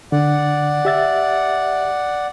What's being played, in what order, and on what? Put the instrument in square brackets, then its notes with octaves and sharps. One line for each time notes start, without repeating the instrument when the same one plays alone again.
[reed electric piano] D3 [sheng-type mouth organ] D5 F#5
[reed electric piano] G4 E5 A6